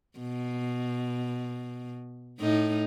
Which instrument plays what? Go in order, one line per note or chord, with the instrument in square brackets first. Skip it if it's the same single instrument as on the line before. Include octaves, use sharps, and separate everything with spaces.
[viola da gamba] B2
A2 D#4